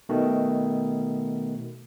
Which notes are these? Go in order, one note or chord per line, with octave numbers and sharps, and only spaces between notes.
B2 D#3 A3